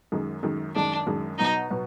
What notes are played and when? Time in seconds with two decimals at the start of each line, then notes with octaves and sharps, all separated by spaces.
0.12 F#2 D#3 G#3
0.43 F#2 D#3 G#3
0.75 F#2 D#3 G#3 D4
1.07 F#2 D#3 G#3
1.38 B2 F#3 B3 D#4
1.70 B2 F#3 B3